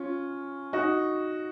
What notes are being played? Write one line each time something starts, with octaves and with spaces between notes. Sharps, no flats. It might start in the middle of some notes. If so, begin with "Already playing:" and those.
Already playing: C#4 F4
D#4 F#4